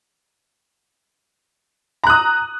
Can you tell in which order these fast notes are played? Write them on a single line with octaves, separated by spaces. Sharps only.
A#5 F#6 D#6